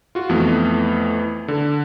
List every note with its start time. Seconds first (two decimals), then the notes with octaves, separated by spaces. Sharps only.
0.15 F4 F#4
0.29 F2 E3 A3 B3
1.48 D3